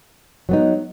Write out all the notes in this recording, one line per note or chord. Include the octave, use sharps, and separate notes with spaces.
F#3 B3 D#4